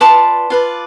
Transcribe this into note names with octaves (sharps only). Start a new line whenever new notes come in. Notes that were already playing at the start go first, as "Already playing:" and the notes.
F4 B4 D5 A5 C6
F4 B4 D5